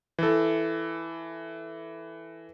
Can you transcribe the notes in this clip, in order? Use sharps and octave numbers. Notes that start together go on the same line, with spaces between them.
E3 A4